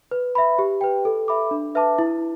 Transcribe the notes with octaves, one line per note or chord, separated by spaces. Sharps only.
B4
E5 B5
G4
B4 G5
A4
E5 B5 D6
D4
B4 E5 A5 D6
E4